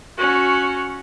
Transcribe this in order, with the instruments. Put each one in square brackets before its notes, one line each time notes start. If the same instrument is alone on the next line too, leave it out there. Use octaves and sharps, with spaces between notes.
[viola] C#4 F#4